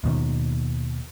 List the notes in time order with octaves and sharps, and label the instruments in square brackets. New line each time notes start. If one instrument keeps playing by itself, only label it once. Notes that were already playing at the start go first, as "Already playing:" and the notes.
[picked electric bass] D#2 B2 D#3